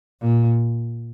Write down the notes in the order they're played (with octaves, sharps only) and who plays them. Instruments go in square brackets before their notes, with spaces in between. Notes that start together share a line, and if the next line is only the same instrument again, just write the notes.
[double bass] A#2